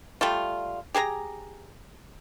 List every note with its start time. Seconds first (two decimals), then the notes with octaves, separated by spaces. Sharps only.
0.21 G3 A3 F4
0.94 G4 G#4 A#4 A#5